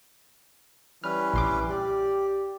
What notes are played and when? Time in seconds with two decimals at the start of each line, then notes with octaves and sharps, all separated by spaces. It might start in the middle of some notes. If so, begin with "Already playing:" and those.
1.04 E3 G3 C#4 B4 F6
1.34 A#1 C6 D6
1.70 G4 D5